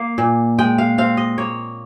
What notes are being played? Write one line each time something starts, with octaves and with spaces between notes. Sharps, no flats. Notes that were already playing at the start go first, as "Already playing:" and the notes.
Already playing: A#3 F5
A#2
G#3 G5
F5
C4 F5
D#5
A#3 C#5